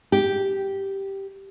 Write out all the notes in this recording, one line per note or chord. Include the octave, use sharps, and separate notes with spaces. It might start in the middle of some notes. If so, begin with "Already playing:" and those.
G4